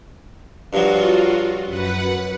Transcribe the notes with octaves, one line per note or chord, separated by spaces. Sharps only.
G2 F3 F#3 F4 F#4
F#2 B4 F#5